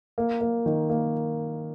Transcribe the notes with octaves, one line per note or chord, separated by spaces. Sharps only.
A#3
A#3
D#3
A#3